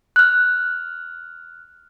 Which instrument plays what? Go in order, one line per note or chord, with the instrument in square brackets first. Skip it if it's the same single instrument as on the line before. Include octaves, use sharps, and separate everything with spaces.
[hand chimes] F6 F#6